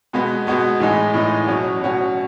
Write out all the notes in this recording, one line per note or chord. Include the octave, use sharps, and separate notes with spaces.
B2 G#3 B3 F#4
B2 G#3 B3 F#4
A2 E3 G#3 D#4
A2 E3 G#3 D#4
B2 F#3 C#4 F#4
B2 F#3 C#4 F#4